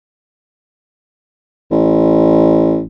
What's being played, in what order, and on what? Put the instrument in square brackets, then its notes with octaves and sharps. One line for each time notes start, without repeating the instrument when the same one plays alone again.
[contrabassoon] A1